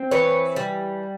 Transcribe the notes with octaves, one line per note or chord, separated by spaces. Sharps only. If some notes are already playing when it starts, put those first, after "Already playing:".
Already playing: C4
E3 B4 C#5
G3